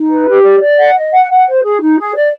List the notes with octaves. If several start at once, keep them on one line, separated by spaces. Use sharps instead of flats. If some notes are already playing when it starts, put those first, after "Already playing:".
Already playing: D#4
B4
G4
D5
D5
F#5
D#5
F#5
F#5
C5
G#4
D#4
G#4
D5